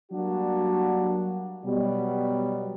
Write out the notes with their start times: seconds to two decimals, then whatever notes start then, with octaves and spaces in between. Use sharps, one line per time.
0.12 F#3 G3 A#3 D4 F#4
1.65 B2 F#3 G3